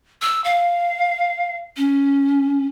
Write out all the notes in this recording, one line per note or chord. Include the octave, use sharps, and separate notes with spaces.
E6
F5
C#4